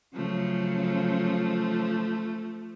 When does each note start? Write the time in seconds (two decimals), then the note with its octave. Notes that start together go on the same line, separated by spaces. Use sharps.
0.15 C#3 F3 F#3 A3